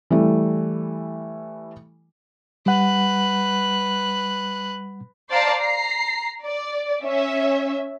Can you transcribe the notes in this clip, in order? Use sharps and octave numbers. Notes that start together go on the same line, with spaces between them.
E3 G3 A3
G3 B4 F#5 F#6
C5 D5 F5 A5 A#5
A#5 C7
D5
C#4 E5